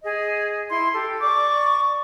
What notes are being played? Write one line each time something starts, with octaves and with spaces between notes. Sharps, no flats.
G#4 D#5
E4 C6
G4 A4
D5 C#6 D6